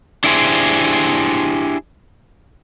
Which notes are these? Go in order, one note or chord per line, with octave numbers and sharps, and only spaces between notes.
D4 E4 G4 G#4 C5